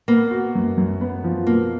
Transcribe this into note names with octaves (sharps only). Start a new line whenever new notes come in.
A#3 B3
F#4
F#2
F#2
B3
F3
B2 A#3